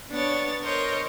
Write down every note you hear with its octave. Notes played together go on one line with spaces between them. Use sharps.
B3 D4 C#5 A6
A#4 C5 C#5 D#5